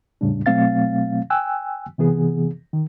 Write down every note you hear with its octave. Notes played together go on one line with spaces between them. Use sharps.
E2 A2 C#3 G3 D4
B2 F#3 A3 C4 F5 A6
G5 G#5 E6 F#6
C3 E3 B3 G#4
D#3